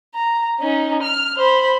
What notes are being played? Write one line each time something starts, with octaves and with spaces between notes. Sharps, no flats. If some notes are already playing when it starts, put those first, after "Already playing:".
A#5
C#4 D#4
F6
C5 B5